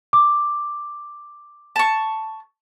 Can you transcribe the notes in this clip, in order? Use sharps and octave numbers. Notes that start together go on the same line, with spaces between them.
D6
A5 C#6